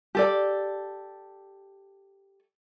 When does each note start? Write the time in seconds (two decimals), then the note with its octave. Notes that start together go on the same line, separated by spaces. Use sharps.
0.15 G4 A4 D5